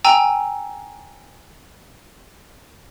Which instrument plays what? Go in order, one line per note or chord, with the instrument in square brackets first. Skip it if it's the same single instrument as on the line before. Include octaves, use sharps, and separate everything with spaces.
[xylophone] G5 G#5 A#5 E6